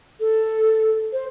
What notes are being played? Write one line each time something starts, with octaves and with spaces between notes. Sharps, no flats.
A4
C5